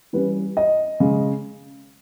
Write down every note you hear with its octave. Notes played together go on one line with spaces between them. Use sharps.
E3 G3 C#4 B4
D#5
C#3 G#3